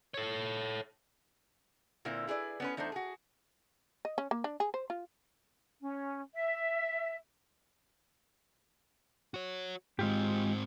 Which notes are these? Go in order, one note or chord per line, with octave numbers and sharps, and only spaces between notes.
A4 C#5
A#2 D3 A#3 C4 E4
E4 G#4 B4 D5
B3 C#4 B4
E2 A3 D4 D#4 C5
F#4 G#4
D#5
C#4
A#3
D4
G#4
C5
F4
C#4
E5
F#4 C#5
G#2 G#3 C4 F4 G4